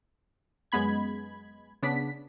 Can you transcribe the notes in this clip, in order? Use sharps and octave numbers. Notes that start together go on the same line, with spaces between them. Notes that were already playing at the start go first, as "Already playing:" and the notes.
F#2 G#3 B3 B5 G#6
C#3 B3 D4 B6